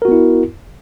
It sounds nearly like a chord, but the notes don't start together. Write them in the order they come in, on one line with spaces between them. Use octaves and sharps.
A#4 F#4 B3 E4